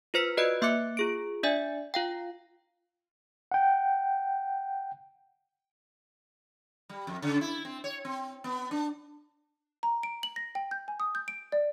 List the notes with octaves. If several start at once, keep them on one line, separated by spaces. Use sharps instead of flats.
F4 B4 C5 F6 B6
F#4 B4 D5 D#5 F#6 D7
A#3 E5 C6 D6 F#6 C#7
F4 G#4 D7
D4 D5 E5 G#5
F4 F5 G5
F#5 G5
G3
F2
C#3
E4
C4
C#5
C4
B3
D4
A#5
D7
F#7
A#6
G5
G6
G#5
D#6
G6
D7
D5